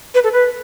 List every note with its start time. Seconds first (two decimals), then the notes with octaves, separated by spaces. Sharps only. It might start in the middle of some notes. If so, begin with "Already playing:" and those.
0.14 B4
0.24 A4
0.32 B4